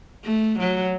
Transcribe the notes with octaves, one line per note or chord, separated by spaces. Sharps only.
A3
F#3